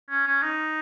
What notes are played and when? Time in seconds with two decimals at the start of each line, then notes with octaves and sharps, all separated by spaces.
0.10 C#4
0.27 C#4
0.43 D#4